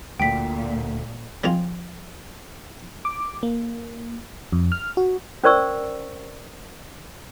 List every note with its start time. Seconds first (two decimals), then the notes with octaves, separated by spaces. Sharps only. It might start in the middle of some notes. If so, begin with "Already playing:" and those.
0.20 D2 A#2 G5 B6
1.44 F3 G#3 C4 F4
3.05 D6
3.43 A#3
4.52 F2
4.72 F6
4.97 F#4
5.44 C#4 A#4 C5 D5 C#6 E6